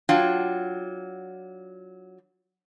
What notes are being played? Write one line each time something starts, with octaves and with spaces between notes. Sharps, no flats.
F#3 D4 F4 G5